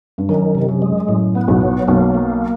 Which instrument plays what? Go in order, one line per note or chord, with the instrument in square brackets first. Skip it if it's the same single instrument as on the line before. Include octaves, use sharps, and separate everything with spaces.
[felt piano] G2
[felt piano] F#2 [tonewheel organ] D#3
[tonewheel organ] C3
[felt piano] F#2
[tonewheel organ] G#3
[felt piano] F#2 [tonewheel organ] A2
[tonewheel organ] B3
[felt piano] B1 B2
[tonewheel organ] F#3
[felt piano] B1 B2 [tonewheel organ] A#3
[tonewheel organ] A#3